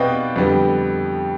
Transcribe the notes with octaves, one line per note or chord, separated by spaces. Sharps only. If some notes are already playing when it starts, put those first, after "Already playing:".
Already playing: B2 C4 B4 D5 D#5 F5 G5
F2 D3 G3 B3